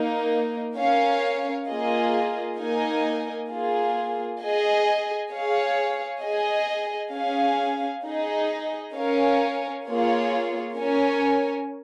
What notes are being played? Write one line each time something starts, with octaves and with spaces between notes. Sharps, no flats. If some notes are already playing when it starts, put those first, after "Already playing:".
Already playing: A#3 D#4 A#4
C#4 A#4 C#5 F5
A#3 F4 G#4 D#5
A#3 D#4 A#4 D#5 G#5
A#3 F4 G#4
G#4 D#5 G#5
G#4 C#5 F5
G#4 D#5 G#5
C#4 G#4 F5 G#5
D#4 G#4 D#5
C#4 A#4 C#5 F5 G#5
A#3 F4 G#4 C#5
C#4 A#4 C#5 G#5